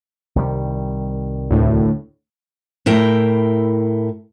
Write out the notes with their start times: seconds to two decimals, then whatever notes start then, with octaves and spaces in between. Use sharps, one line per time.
0.36 C2 D#3 G3
1.51 D2 A2
2.86 A2 E4 A#4 G5